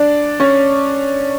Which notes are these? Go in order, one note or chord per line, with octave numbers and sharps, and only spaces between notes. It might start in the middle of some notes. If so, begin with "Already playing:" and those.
Already playing: D4 D5
C#4 C#5